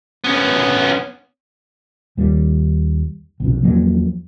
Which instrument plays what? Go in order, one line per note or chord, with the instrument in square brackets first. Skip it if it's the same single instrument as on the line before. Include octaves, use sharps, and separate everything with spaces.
[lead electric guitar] B3 C#4
[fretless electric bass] D#2 G3
B1 F2 C3
E2 F3 F#3 A#3